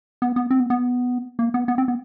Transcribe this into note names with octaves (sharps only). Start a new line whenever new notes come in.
B3
B3
C4
B3
B3
A#3
B3
B3
C4
B3